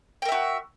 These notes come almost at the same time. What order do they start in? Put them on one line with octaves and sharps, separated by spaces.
G5 A#4 E5 F#4